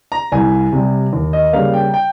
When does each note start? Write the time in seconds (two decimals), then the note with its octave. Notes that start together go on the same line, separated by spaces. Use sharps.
0.12 A#5
0.32 C2 G#5
0.72 C3 G3
1.13 D#2
1.33 D#5
1.53 C#3 G3 A#3 F5
1.74 G5
1.94 G5